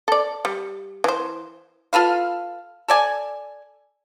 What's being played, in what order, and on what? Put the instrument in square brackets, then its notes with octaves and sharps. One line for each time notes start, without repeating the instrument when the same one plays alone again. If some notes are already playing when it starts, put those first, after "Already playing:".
[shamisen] A4 D5
G3
E3 C5
[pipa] F4 A4 B4 F5
A4 D5 G#5